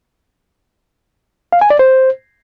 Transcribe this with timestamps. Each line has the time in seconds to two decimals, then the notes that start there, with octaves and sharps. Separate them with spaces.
1.52 F5
1.61 G#5
1.70 D5
1.79 C5